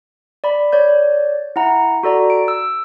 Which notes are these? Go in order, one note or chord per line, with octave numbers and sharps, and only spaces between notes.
D5 B5
C#5 D5 G6
E4 F#5 A#5
F#4 A4 D5 A#5
D7
E6